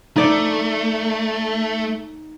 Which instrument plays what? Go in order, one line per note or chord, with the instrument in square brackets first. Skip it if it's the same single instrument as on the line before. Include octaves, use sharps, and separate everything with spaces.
[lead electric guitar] A3 [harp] D#4 D5